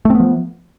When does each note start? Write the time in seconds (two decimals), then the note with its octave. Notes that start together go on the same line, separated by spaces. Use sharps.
0.05 A3
0.10 C4
0.15 B3
0.20 F3